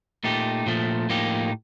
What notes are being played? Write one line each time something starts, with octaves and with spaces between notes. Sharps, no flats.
A#2 A3 D#4 G4
A#2 F3 A3
A2 F3 A#3 D#4 G4